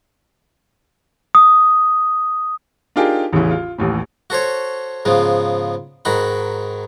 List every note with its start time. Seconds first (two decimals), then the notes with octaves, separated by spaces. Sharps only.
1.35 D#6
2.96 D4 D#4 F4 G4 G#4 A#4
3.33 A1 E2 C#3 E3
3.51 F4
3.78 A1 D#2 A2
4.30 F#4 A4 C5 C#5
5.05 G#2 C#3 F3 B3
6.05 G#2 D#3 F#4 B5